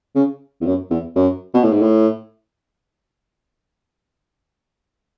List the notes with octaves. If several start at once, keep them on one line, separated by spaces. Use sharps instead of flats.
C#3
E2
F#2
E2
F#2
B2
A2
G#2
A2